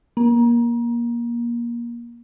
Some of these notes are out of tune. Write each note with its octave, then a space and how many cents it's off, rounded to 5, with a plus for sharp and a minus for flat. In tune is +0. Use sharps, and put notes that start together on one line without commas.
A#3 +25